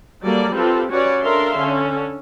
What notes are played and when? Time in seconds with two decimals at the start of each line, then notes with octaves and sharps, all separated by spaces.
0.22 F#3 G3 A#3 A4 D5
0.54 C4 F4 G4 A4 B4
0.91 C#4 F#4 B4 C#5 D5
1.22 D4 A4 A#4 E5 F5 C6
1.58 D3 C#4 A4